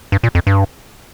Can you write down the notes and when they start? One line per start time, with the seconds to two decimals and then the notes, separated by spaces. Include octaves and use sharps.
0.12 G2
0.23 A#2
0.35 F2
0.47 G2